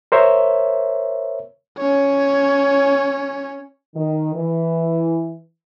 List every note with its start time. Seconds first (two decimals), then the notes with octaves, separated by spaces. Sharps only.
0.12 A#4 C5 C#5 E5
1.78 C#4 C#5
3.96 D#3
4.34 E3